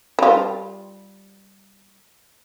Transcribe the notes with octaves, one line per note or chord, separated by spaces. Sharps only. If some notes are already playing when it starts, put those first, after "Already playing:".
G3 F4